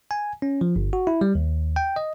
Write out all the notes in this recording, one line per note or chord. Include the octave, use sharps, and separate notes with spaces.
G#5
C#4
F3
G1
F#4
E4
G3
D#2
G5
D#5